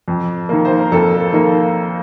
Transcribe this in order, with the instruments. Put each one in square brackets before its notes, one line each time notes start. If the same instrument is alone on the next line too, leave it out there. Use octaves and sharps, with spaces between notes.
[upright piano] F2
D#3 A#3
C5
A#4
F2 A4
D#3 A#3